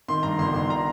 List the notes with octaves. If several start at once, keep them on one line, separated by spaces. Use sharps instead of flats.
D#3 C6
G2 A#5
G1 C6
G1 C6
A#5